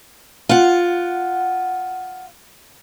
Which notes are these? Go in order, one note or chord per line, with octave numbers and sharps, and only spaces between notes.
F4 F#5